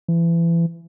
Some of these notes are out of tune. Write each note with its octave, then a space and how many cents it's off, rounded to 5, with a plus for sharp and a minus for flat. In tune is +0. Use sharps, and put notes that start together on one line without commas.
E3 +30